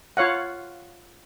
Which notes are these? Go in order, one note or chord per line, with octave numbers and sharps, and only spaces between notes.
F4 C#5 F5 F#5